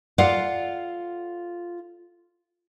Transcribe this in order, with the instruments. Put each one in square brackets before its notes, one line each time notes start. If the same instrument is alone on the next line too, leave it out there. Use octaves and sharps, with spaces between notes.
[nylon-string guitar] F4 A4 D5 F5 F#5